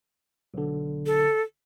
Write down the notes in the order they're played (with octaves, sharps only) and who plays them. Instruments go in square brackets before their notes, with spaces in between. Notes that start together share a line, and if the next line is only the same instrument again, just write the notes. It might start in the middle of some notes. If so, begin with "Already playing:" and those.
[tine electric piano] B1 D3
[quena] A4